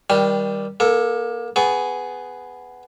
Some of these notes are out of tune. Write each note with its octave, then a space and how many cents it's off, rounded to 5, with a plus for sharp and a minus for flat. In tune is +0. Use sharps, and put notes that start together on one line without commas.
D#3 +30 G3 +0 C6 +0
A#3 +30 A4 +5
B3 +10 G#4 +5 C#6 +20